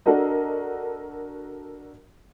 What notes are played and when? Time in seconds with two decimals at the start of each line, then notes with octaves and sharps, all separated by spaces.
0.06 D4 F#4 A4 A#4 D#5